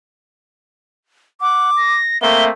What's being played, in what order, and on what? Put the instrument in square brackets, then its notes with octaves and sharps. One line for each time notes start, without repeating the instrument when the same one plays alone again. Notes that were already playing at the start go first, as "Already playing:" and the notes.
[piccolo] F#5 [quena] D6
[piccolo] A#6
[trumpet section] A3 A#3 C4 [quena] E5 [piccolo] G7